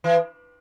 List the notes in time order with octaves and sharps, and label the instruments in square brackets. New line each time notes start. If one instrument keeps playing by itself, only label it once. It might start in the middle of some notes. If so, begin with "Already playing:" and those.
[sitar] E3